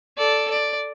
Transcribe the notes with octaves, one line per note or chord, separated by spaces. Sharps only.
A4 D5
D5